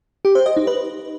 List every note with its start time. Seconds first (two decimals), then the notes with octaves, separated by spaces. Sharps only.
0.25 G4
0.35 C5
0.46 D#5
0.57 D#4
0.67 B4